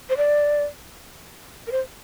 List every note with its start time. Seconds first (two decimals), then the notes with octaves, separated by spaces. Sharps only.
0.09 C5
0.17 D5
1.67 A#4
1.72 C5